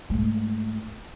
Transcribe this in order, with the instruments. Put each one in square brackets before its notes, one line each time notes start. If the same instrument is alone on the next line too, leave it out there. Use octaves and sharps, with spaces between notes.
[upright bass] G#2 A3